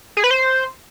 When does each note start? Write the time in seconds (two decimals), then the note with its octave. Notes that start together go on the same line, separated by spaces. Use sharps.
0.17 G#4
0.24 B4
0.31 C5